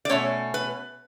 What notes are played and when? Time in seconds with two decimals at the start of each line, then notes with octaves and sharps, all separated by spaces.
0.05 D5
0.09 B2 A3 C#4 C#5
0.54 B4